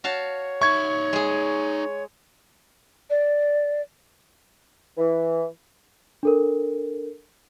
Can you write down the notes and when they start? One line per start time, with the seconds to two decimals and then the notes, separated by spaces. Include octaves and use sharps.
0.04 F#4 C#5 F5 A5
0.62 D#4 E5 C#6 G#6
1.13 G#3 G#4
3.10 D5
4.98 E3
6.23 D4 A4 A#4